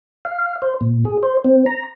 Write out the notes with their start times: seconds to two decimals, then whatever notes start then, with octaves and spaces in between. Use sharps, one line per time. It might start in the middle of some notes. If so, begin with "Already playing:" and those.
0.25 F5
0.62 C5
0.81 A#2
1.05 G#4
1.23 C5
1.44 C4
1.66 A#5